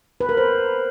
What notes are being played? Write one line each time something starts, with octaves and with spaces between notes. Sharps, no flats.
B4
A#4
C5